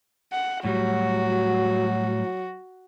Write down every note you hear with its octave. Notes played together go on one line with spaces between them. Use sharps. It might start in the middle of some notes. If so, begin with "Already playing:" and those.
F#5
A2 F#3 G3 F#4